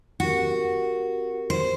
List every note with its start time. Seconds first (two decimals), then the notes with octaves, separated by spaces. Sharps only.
0.20 C4 F#4 G4 A#4
1.50 C5